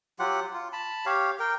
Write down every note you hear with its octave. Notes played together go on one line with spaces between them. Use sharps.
F#3 F4 G4 F#5
F4
A5 B5
G4 C#5 F5
A#4 G5